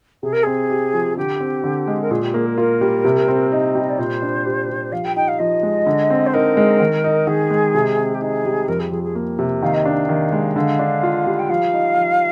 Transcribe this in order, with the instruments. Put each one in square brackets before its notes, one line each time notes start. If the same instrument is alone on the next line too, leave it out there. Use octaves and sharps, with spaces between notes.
[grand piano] C3 [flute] G#4
[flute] A#4
[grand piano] C4 [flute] G#4
[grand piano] G4
F3
[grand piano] D3 [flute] G4
[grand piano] C4
D3
G#3
[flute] A#4
[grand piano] A#2 [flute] G#4
[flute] G4
[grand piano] A#3 [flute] G#4
[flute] A#4
[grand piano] F4 [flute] A#4
[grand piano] G3
C3
C4
D#4
[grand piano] G3 [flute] D#5
[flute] D5
[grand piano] A#2 [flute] C5
[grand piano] D4
G4
G3
[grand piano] F3 [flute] F5
[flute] G5
[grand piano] D#4 [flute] G5
[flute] F5
[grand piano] F3 [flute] D#5
[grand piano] G#3
D3
C4
[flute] C5
[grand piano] D#4 [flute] A#4
[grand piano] G#3
D#3
D#4
[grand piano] D#3 [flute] G#4
[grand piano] G#3
C3
C4
[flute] G4
[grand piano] D#4 [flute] G#4
[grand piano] G3
[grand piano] F2 [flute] A#4
[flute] G#4
[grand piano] F3 [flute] G#4
[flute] G#4
[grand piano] A#3
C3
[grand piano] D#3 [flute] F5
[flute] D#5
[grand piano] D4 [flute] F5
[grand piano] D#3
G#3
[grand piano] D3 [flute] F5
[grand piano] D4
F4
G3
[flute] G5
[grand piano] F3 [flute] F5
[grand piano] D#4
F3